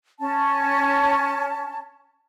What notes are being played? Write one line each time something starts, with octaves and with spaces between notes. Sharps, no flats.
C#4 A5